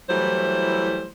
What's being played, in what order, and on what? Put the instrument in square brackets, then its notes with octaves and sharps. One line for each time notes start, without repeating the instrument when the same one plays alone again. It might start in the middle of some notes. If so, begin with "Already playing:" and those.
[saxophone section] E3 F#3 G3 A3 E4 C5